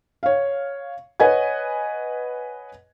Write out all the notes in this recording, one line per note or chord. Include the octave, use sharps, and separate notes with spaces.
C#5 F5
B4 C#5 D#5 F#5 G#5 G#6